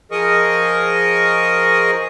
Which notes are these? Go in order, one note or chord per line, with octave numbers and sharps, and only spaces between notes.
F3 G#4 A#4 D#5 C#6 D#6